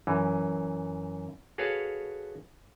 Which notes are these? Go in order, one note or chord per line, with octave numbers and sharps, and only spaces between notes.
F#2 E3
F#4 G#4 A4 B4 C#5 F5